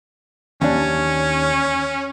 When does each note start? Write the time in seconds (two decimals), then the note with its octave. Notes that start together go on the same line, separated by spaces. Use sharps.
0.62 D#2 C#4 D4